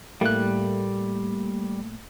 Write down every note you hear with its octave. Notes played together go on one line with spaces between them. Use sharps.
A2 G3 A3 A#3 F#6